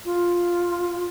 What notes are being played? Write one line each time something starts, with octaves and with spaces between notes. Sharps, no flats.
F4